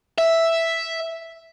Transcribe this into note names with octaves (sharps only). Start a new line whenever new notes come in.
E5